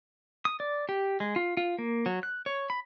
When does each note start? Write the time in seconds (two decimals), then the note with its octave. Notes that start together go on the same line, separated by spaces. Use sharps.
0.45 D#6
0.60 D5
0.89 G4
1.20 G#3
1.36 F4
1.57 F4
1.78 A#3
2.06 F#3
2.23 F#6
2.46 C#5
2.70 B5